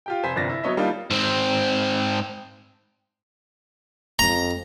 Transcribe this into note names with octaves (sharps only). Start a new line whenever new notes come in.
F4 G4 G5
F1 C5 G#5 B6
G1 C2 F3 D5 A6 A#6
E4
F#3 B3 C#5 D#5 E5
G3 A#3 D4 D#4 F4
G#2 C4
F2 A#5